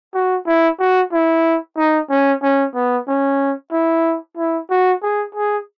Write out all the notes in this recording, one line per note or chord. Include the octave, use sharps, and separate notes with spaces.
F#4
E4
F#4
E4
D#4
C#4
C#4
B3
C#4
E4
E4
F#4
G#4
G#4